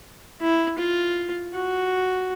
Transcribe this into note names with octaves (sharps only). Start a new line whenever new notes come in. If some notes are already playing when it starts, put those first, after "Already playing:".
E4
F4
F#4